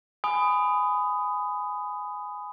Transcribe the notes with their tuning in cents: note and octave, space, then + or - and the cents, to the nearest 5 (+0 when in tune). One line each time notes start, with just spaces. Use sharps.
G#5 +0 B5 +25 D#6 +0